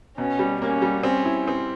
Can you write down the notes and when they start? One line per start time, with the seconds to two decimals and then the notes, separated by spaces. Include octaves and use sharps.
0.18 B2 C#4
0.39 G3
0.61 A#3 C#4
0.82 G3
1.03 C4 C#4
1.25 E4
1.48 C4